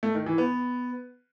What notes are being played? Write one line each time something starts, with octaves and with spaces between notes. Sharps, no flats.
A3
D#3
E3
B3